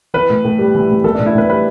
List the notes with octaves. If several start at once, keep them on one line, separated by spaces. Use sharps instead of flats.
E3 B4
A2
A2
G3
E3
A2
E3 A4
A2 D4
E4
A2 B4
G3 B4